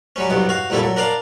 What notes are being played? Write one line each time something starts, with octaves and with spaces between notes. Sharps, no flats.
F#3 G3 C#4
C2 G2 B2 F#3
F#4 F5
C2 A#2 G3 E4 A4
F#3
D4 A#4 D5 F5